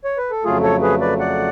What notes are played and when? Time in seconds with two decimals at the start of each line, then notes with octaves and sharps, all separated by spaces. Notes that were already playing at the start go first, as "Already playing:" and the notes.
0.04 C#5
0.18 B4
0.31 A4
0.44 F2 C#3 F#3 A3 F4 G#4
0.63 A4 C#5
0.82 G#4 B4
1.01 B4 D5
1.20 D5 F#5